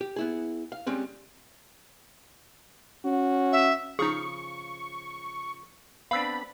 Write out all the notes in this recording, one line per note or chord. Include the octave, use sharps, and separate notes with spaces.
G4
B3 E4 G#4
F5
G3 G#3 C4 C#4
C#4 F#4
E5
C#3 F3 D#4 G#4 C#6
B3 C4 D4 F5 B5 E6